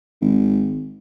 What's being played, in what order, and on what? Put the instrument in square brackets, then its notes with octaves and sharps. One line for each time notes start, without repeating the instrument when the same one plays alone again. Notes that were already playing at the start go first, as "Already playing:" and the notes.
[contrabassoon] G#1